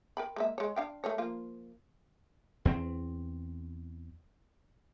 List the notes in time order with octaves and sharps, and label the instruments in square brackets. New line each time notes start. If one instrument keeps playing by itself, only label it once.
[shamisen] A#4 G5 B5
G#3 A#3 E5
G#3 C#5
D4 F5 G5
A3 A#4 C#5
F3 A#3 F4
[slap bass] E2 C4